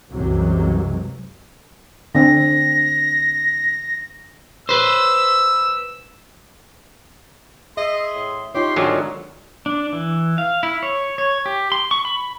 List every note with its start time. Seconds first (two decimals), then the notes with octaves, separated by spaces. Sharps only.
0.12 C2 F#2 C3 E3 F#3 G#3
2.15 D3 C4 A#6
4.69 B4 C5 E6
7.77 G#4 D#5 E5 C6
8.14 A2
8.55 D#4 F4 G4 C#5 C6
8.76 G#1 D3 F#3 G#3 A3 F#4 A#4
9.66 D4
9.93 E3
10.38 F5
10.63 E4
10.83 C#5
11.18 C#5
11.46 G4
11.72 C6
11.91 C#6
12.05 B5